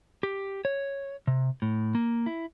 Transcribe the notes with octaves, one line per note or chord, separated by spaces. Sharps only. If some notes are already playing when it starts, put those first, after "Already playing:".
G4
C#5
C3
A2
A#3
E4